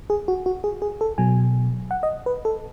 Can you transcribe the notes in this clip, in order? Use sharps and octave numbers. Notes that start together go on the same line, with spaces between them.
G#4
F#4
F#4
G#4
G#4
A4
B2 F#3 G#5
F#5
D#5
B4
A4